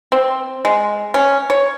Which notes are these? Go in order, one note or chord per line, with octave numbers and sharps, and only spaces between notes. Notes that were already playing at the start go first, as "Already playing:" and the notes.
C4
G#3
C#4
C#5